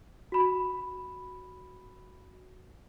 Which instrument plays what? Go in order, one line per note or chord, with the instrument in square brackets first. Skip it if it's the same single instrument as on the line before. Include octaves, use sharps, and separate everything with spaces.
[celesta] F#4 B5